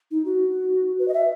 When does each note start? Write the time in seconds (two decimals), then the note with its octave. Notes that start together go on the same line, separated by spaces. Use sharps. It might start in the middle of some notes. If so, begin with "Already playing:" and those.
0.11 D#4
0.25 F#4
0.99 B4
1.08 D#5
1.14 E5